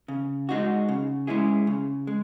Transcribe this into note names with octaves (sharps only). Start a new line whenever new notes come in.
C#3
G#3 D#4 F#4
C#3
G#3 C#4 E4 G#4
C#3
G#3